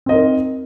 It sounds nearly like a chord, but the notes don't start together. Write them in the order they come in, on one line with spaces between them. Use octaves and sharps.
C4 D#5 A#4 D#4